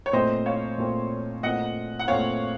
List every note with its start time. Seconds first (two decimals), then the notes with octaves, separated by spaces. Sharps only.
0.06 C#5
0.13 A#2 A3 C4 C5 D#5
0.46 C#5 F5
0.78 A#2 A3 C4
1.43 A#2 A3 C4 D#5 F#5
1.99 F#5
2.07 A#2 A3 C4 C#5 F5